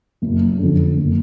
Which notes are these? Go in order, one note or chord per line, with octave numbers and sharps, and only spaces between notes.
F#1
F2 D3
F#1